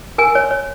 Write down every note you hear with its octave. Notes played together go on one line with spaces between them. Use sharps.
A#4 G#5
C#5
C#5